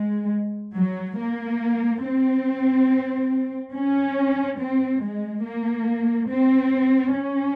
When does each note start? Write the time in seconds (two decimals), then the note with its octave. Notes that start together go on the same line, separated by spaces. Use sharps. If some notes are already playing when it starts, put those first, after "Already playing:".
Already playing: G#3
0.76 F#3
1.18 A#3
2.02 C4
3.73 C#4
4.59 C4
5.01 G#3
5.43 A#3
6.28 C4
7.14 C#4